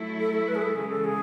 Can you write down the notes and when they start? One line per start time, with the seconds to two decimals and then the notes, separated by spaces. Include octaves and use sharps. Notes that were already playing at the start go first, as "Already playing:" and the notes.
Already playing: F#3 A3 E4
0.20 A4
0.33 A4
0.48 B4
0.55 G#4
0.62 A4
0.76 C#3 E3 G#3 G#4
0.90 A4
1.04 G#4